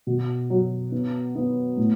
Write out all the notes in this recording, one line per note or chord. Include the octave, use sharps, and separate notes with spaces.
B2
F#3
B3
B3
A2